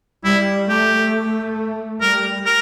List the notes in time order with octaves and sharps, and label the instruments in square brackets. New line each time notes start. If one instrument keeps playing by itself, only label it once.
[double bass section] G3 [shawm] E4
[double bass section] A3 [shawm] G4
[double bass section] G3 [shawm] A#4
[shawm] A#4